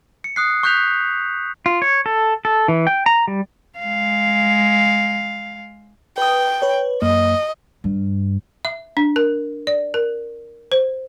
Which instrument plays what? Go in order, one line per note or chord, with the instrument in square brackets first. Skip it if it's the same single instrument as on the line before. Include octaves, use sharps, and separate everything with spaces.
[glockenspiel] C#7
D#6 F#6 C7
C#6 F#6 G6 B6 F7
[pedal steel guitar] F4
C#5
A4
A4
E3
G5
A#5
G3
[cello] G#3 F5
[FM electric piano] B4 D#6 [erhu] G5
[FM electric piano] B4 C#5
[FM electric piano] F#2 A#3 [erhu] D#5
[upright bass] G2
[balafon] E5
D4
A#4
D5
A#4
C5